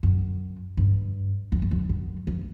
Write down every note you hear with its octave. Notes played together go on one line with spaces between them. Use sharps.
F#2
G2
F2
F2
F#2
F#2
F2